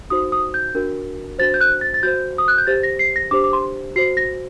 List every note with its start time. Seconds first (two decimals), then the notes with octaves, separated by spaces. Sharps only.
0.10 D#4 F#4 C5 D#6
0.32 D#6
0.54 G6
0.75 D4 F#4 A#4
1.39 D4 F#4 C5 A6
1.54 G6
1.61 F#6
1.81 A6
1.94 A6
2.03 F#4 C5 G6
2.38 D#6
2.48 F#6
2.58 G6
2.67 G4 C5 A6
2.83 A#6
2.99 C7
3.16 A#6
3.31 D4 G4 C5 D6
3.44 D6
3.53 C6
3.96 F#4 C5 C7
4.17 A#6